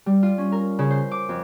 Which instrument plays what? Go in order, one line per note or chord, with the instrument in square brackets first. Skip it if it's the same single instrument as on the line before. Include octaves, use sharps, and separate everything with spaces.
[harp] G3
F4
C#4
A#4
C#3
C5
D6
F2